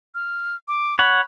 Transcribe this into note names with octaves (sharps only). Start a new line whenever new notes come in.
F6
D6
C#5 F#5 B5